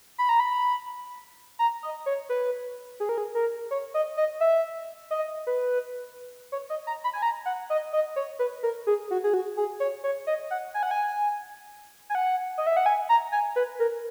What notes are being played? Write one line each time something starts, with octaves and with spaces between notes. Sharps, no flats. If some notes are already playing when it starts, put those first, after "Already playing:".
B5
A#5
B5
A#5
D#5
C#5
B4
G#4
A#4
G#4
A#4
C#5
D#5
D#5
E5
D#5
B4
C#5
D#5
A#5
B5
G#5
A#5
F#5
D#5
D#5
C#5
B4
A#4
G#4
F#4
G#4
F#4
G#4
C#5
C#5
D#5
F#5
G#5
F#5
G#5
G#5
F#5
D#5
E5
F#5
G#5
A#5
G#5
B4
A#4